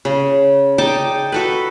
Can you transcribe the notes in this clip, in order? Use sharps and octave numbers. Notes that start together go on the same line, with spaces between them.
C#3
D#4 G5 A5 D6
F#4 A4 B4